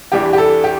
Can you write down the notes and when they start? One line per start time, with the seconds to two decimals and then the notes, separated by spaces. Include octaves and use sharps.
0.12 E2 C3 E3 G3 D4 G4
0.33 G4
0.38 A4
0.64 G4